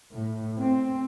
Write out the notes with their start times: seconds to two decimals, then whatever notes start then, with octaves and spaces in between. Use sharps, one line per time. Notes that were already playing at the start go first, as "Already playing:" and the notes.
0.13 A2
0.57 C4